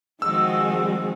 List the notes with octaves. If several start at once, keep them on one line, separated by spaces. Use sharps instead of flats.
D#3 F3 G#3 C4 F#4 E6